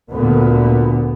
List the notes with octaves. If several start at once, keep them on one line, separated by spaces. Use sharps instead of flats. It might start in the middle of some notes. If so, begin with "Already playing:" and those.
D2 A#2 D3 B3